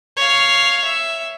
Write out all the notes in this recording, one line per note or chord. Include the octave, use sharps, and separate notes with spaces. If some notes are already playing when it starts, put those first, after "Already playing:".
C#5 F5
E5